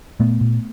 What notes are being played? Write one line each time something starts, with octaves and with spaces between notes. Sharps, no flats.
A#2 A3 B3
A#2